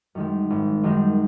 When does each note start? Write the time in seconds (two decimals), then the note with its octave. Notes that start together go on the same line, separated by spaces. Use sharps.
0.15 F#2 D#3 G#3
0.50 G#1
0.83 F#2 D#3 G#3